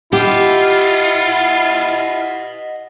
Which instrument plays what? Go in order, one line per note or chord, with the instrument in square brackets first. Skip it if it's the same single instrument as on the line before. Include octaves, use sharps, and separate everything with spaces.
[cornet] E4 [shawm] F4 [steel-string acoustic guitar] G4 [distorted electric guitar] D#5 F#5